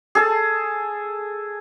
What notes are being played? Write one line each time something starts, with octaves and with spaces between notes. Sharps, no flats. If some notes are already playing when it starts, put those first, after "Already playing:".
G#4 A4 A5